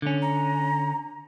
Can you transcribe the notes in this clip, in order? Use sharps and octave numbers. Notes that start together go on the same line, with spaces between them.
D3 C#4
A#5